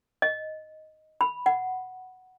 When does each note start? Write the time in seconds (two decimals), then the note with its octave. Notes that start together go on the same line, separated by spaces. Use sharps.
0.22 D#5
1.21 B5
1.46 F#5